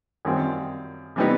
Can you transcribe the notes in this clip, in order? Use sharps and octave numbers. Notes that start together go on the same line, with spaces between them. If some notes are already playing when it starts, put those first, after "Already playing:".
F#2 D#3 G3 C4 F4
C3 E3 G3 B3 D#4